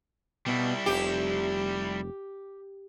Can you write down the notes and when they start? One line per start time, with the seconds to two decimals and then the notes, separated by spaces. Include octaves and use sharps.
0.46 B2 G3 E4
0.86 F1 G4